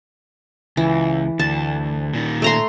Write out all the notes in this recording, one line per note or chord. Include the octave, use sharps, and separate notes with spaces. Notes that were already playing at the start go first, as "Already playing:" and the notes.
C#2 E3
D2 A5
A#2 D#3
A3 A#5 C6